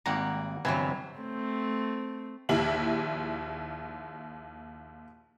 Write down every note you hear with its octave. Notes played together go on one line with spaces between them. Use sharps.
G#1 G3 A#3 F#5 A#5
G1 C3 E3 F#3 B4 G#5
A3 C4
A#1 D#2 E4 G4 F#7